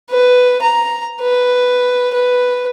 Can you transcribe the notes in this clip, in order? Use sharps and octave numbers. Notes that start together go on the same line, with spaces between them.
B4
A#5
B4
B4